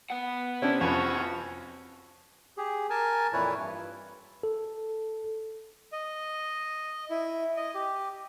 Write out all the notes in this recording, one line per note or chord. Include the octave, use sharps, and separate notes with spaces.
B3 F#5
C3 C#4 D4 E4
F2 C#4 F4 F#4 B4
G4 G#4
A#4 G#5 A5
F2 A#2 E3 E4 B4 C#5
G2
A4
D#5
E4
D#5
G4